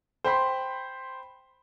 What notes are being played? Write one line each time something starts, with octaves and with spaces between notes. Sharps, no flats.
C5 G5 B5 C6